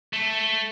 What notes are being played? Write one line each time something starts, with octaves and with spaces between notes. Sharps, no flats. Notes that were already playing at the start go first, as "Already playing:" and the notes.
A3